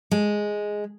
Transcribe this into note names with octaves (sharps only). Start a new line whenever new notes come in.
G#3